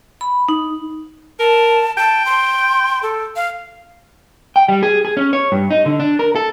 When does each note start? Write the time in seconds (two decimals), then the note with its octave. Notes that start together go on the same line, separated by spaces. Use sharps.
0.21 B5
0.49 D#4
1.40 A#4 A5
1.97 G5 A5
2.26 C6
3.03 A4
3.36 F5
4.56 G5
4.68 G3
4.83 G#4
5.05 G#4
5.17 C#4
5.33 C#5
5.52 G2
5.71 D#4
5.86 D3
6.00 D4
6.19 A#4
6.36 A4